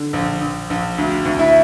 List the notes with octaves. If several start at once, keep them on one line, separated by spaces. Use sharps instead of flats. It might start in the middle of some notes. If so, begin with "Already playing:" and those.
Already playing: D3
A#1
A#1
A#1
D2
D2
E4 E5